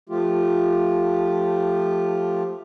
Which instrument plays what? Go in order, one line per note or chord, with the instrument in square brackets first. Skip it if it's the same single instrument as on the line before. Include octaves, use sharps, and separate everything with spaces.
[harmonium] F3 A3 F4 G4